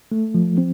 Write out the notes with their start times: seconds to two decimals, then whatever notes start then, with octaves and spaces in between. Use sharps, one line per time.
0.12 A3
0.35 F3
0.58 C4